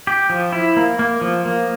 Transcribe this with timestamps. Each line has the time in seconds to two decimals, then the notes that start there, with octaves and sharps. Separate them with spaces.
0.07 G4
0.30 F3
0.53 E4
0.77 A#3
0.99 A#3
1.21 F3
1.45 A#3